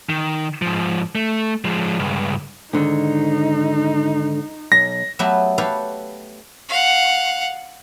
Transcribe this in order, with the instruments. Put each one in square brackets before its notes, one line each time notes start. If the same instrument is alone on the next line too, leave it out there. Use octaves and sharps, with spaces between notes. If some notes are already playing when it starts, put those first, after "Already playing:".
[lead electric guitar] D#3
G#2 F3
A3
F3 G#3
C#2 G2
[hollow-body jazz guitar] G#2 D3 D#3 [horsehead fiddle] D#4
[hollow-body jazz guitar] B1 [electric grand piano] A#6
[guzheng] F#3 A3 B3 G4 B4 E5
G4 A4 B4 C#5 F5
[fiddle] F5 F#5